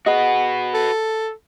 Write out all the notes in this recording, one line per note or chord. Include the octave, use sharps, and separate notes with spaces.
F#4 G#4 B4 D#5 F#5
A4